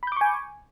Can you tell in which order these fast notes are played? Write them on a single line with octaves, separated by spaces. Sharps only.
B5 G6 D6 C#6 G#5